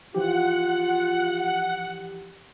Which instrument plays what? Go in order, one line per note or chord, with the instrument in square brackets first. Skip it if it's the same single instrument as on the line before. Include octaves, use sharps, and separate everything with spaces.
[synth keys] E3 F3 G4 [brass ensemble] F4 [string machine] F#5